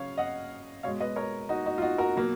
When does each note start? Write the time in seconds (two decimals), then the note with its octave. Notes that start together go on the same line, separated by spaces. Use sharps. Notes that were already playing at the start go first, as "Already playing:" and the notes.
Already playing: C#3 F#3 C#5 F5
0.18 D#5 F#5
0.83 B2 G#3 C#5 F5
1.00 B4 D#5
1.16 A#4 C#5
1.49 D#4 F#4
1.66 D#4 F#4
1.78 F4
1.82 D#4 F#4
1.98 F#4 A#4
2.16 B2 F#3 A#3